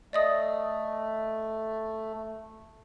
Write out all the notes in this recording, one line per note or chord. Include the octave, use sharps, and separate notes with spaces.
A3 D5 D#5 D#6